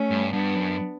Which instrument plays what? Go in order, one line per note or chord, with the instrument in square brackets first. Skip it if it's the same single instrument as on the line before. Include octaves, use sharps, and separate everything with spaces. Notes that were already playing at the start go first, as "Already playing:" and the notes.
Already playing: [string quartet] A3 C#4
[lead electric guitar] G2
[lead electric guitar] G2 [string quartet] B3 D4
[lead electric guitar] F#2